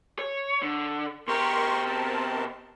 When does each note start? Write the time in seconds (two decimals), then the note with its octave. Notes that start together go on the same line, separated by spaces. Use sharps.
0.19 C#5
0.62 D3
1.28 B2 G4 A#4 C6 C#6
1.85 C4 A#4 A5